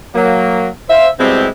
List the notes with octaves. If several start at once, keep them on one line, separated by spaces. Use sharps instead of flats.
F#3 A#3
C5 E5 F5
B2 G3 G#3 C4 E4 G4